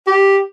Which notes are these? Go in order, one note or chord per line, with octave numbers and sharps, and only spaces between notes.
G4